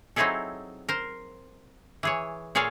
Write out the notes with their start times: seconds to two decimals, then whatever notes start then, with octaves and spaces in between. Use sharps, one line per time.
0.16 F#3 C4 D#4 E4 G#4 A4
0.89 A#4 C5
2.03 E3 G#4 C#5
2.55 A#2 G#4 A4 C#5 F5